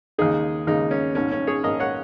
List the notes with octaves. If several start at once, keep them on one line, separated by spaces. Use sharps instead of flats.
D#2 C#3 G#3 D#4 G#4
D#2 C#3 G#3 D#4
C#4
A#1 G#2 D#3 C#4
C#4
G#4 C#5
A#1 G#2 D#3 A#4 D#5
C#5 F#5